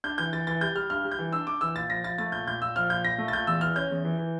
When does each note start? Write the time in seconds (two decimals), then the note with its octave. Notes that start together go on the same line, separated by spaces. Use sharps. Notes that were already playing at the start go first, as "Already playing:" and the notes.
0.04 D4 G6
0.18 E3 G6
0.33 E3 A6
0.47 E3 A6
0.61 G3 G6
0.75 G3 F6
0.90 G2 F6
1.04 G3
1.12 G6
1.19 E3
1.33 D4 E6
1.47 D4 D6
1.61 E3 E6
1.76 A#2 A6
1.90 F3 A#6
2.04 F3 A6
2.18 A3 A6
2.32 A#2 G6
2.47 A#2 G6
2.62 A#2 E6
2.76 F3 F6
2.90 A#2 G6
3.04 A#2 A#6
3.18 A3
3.28 A6
3.33 A#2 G6
3.47 E2 E6
3.61 E3 F6
3.76 C#4 G6
3.91 E2
4.05 E3
4.19 E3